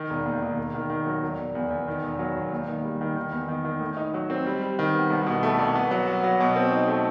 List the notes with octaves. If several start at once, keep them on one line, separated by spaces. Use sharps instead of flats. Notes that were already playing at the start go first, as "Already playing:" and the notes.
Already playing: D#3
E1
D#2
D#3
E1
D#3
D#3
F#3
E1
E1
E2
E2
D#3
E1
F#3
E1
D#2
D#3
G3
D#3
D#3
E2
D#3
D#3
A2
D#4
F#3
C4
G3
G3
D#3
B3
C2
B2
A3
C2
B3
F#3
F#4
F#3
B2
C4
D#4
A3